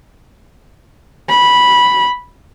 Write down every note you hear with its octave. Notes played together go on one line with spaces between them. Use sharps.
B5